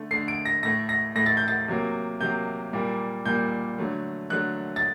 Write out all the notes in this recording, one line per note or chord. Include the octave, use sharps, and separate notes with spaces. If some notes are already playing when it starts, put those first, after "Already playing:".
Already playing: D3 A3
D3 A3 C7
D7
A#6
A2 A3 A#6
A#6
A2 A3 A#6
A6
G6
A6
C3 F#3 A#3
C3 F#3 A#3 G6
A#2 G3 A#3
A#2 G3 A#3 G6
D3 F#3 A3
D3 F#3 A3 F#6
A6